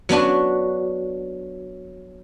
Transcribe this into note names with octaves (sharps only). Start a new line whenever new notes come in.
F#3 B3 D4 F#4